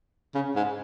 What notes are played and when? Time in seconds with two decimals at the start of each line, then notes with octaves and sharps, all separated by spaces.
0.35 C#3
0.56 G#2